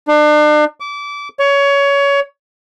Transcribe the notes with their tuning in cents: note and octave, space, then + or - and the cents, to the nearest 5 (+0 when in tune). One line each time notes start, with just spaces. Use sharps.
D4 +40
D6 -25
C#5 +20